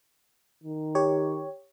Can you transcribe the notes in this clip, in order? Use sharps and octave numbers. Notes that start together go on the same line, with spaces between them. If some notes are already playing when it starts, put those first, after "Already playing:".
D#3
G4 C#5